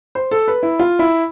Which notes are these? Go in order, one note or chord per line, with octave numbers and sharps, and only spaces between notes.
C5
A4
B4
E4
F4
E4